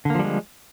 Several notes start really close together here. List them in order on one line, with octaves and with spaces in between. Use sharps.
D3 A#3 F3 G3 G#3